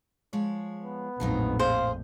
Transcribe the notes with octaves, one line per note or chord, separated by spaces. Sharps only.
F3 G#3 C#5
B3
A#1 F2 A2 F3 F#3 D#4
G#4 C5 F5